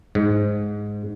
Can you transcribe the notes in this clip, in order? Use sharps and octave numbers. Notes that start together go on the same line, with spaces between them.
G#2